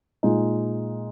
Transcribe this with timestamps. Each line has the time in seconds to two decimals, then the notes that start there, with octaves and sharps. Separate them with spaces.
0.23 A#2 G#3 D#4